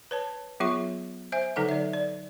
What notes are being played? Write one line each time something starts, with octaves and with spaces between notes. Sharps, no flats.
B4 C#5 A5
F#3 B3 F4 G#4 E5 C#6
C5 E5 G#5
D3 F#3 D#4 A4 B4 F#5
D5 E5
D5